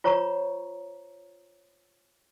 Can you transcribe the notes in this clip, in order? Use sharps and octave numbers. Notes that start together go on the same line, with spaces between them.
F4 C5 C#5 A#5 C#6